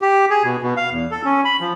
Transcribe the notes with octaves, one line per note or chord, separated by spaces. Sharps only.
G4
G#4
B2
B2
F5
E2
A4
C#4
B5
F3